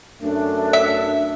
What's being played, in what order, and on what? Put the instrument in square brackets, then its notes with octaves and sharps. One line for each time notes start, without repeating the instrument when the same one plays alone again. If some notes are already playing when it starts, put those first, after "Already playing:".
[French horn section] F#2 A3 [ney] D4
[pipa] E5